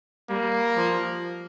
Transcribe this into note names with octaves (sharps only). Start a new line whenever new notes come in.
G3 A#3
F3